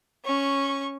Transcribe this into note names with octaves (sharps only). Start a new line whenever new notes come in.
C#4 C#6